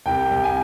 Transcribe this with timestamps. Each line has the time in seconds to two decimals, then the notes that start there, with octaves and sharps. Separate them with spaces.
0.06 C2 G5
0.31 C2
0.44 G#5